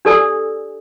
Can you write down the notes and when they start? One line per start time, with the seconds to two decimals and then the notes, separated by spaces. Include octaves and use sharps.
0.05 D4 G4 A4 D5 G#5 E6